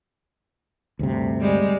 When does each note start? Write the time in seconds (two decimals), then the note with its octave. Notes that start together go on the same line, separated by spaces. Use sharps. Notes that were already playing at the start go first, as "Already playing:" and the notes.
0.99 D2 G2 C3
1.41 G3 G#3